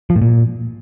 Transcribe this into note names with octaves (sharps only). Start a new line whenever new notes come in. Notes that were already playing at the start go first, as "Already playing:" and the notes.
F3
A2
A#2